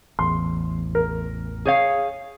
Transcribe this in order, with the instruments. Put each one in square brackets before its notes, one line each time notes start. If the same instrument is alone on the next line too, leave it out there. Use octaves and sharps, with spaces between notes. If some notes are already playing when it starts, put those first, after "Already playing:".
[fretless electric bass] A1 E2 [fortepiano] C6
[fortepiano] A#4
[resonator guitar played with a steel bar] G#4 C#5 F5